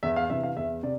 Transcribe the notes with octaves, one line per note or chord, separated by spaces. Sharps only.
E2 E5
F5
C3 E3 E5
F5
E2 E5
C3 D5